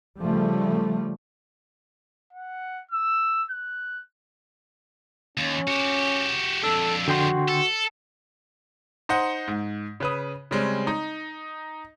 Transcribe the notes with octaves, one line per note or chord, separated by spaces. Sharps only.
C#3 F3 G3 A3
F#5
E6
F#6
D#2 C#4
F#4 G4
F2 D4 A4 E6
D3 F#4 G5 C6
A4
D#4 C5 D#5 F#5
G#2
C#3 B4 D#6
C#3 G3 G#3 C4 C#4
D#4